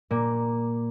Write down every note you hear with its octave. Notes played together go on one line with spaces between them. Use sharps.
A#2 A#3